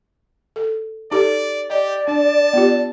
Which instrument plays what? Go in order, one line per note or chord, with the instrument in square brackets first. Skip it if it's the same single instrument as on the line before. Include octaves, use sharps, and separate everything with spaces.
[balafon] A4
[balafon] D#4 G4 A4 [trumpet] D5
[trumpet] G4 [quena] D5 [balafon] D#5
[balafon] D4 [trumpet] A5
[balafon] B3 F4 G4